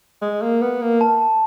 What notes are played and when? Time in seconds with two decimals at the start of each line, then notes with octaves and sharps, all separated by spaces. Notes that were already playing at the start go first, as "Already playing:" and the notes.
0.22 G#3
0.42 A#3
0.62 B3
0.81 A#3
1.01 A5